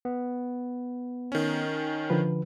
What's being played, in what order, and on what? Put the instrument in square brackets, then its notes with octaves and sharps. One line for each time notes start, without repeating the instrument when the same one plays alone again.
[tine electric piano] B3
[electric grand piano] D#3 C#4
[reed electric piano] D3 F3 B4